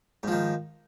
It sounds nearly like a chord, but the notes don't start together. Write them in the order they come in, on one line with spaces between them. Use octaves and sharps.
G#2 F3 D#3